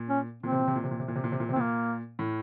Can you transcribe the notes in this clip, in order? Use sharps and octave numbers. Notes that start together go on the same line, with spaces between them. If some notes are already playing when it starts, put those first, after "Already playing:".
Already playing: A#2
C#4
A#2 C4
C3
A#2
C3
A#2
C3
A#2
C3
A#2
C3
A#2
C3
A#2
C3
C4
A#2 A#3
A2